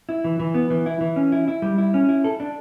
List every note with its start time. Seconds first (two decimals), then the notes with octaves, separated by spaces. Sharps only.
0.09 E4
0.24 E3
0.40 E3
0.54 B3
0.70 E3
0.86 E4
1.01 E3
1.16 C#4
1.32 E4
1.48 E4
1.62 G3
1.78 E4
1.94 C#4
2.09 E4
2.24 A4
2.40 D4